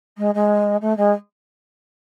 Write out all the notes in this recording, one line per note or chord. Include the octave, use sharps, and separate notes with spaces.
G#3
G#3
A3
G#3